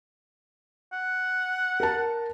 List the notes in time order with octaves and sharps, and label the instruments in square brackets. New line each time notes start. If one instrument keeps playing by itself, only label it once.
[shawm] F#5
[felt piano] A#4 A5